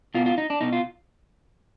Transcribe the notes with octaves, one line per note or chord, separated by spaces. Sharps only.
B2 F4
F4
D#4
D4
B2 D#4
F4